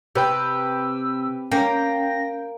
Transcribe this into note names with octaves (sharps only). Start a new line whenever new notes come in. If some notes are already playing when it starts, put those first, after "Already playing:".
C3 G4 B4 G5 E6
A#3 C#4 G5 A#6